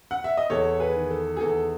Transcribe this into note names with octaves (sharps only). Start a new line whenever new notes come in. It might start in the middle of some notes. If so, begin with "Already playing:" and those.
F#5
E5
D#5
E2 A4 C#5
G#4 B4
D#3
A4
G#4
E2 A4